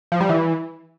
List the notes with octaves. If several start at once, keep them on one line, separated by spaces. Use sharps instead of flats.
F3
G3
E3